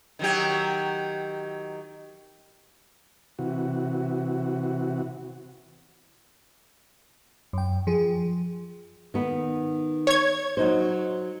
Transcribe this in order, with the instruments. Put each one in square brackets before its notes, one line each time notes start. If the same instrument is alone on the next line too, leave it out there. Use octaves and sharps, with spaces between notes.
[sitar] D#3 F#3 G4
[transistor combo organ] C3 E3 F#4
[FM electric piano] F#2 G5
F3 G#4
[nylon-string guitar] D#3 B3
[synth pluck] C#5 G#6
[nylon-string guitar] F#3 D#4 C5